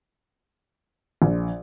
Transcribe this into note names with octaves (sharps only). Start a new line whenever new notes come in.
A#1